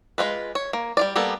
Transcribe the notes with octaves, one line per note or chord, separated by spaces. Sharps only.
G#3 A#3 F4 B4
C#5
A#3
G3 F4 D5
G3 A#3 B3 A4